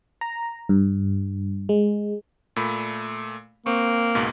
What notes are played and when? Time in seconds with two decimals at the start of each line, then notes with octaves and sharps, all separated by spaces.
0.21 A#5
0.69 G2
1.69 G#3
2.56 A#2 A3 B5
3.66 A#3 C4 C#6
4.15 C#2 G#2 B2